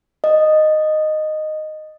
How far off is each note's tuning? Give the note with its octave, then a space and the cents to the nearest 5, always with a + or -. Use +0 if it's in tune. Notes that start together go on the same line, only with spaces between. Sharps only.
D#5 -10